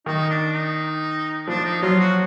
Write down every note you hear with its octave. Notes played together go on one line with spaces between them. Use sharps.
D#3 D#4
D4
D#4
F3 D4
D#4
F#3 F4
F#4